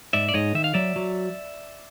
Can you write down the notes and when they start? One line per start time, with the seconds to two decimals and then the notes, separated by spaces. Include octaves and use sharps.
0.13 G#2 D5 E5
0.29 D5
0.34 G#2 C#5 D#5
0.54 D#3 E5
0.64 F5
0.74 F#3 D5 E5
0.96 F#3